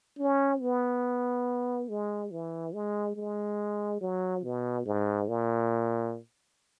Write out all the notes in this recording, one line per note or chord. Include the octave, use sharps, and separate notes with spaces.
C#4
B3
G#3
E3
G#3
G#3
F#3
B2
G#2
A#2